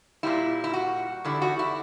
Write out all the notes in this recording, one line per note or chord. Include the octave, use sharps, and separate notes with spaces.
A#2 G3 E4
E4
F#4
E2 D3 G3 E4
F#4
E4